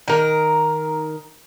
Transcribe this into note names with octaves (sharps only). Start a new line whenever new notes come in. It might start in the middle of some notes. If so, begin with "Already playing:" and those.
D#3 A#4